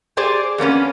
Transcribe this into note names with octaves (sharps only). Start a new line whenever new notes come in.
G4 G#4 C5 D5
F2 A#3 B3 C#4